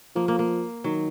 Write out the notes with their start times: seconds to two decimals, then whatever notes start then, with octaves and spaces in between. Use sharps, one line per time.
0.16 F3 A#3
0.28 A#3
0.39 A#3
0.84 D#3 F#3